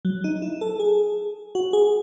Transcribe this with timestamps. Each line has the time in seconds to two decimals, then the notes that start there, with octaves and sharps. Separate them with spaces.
0.05 F#3
0.24 D#4
0.42 E4
0.61 A4
0.80 G#4
1.55 F#4
1.73 G#4